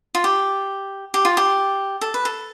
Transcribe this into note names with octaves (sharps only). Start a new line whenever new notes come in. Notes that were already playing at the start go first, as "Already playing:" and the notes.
F4
G4
G4
F4
G4
A4
B4
A4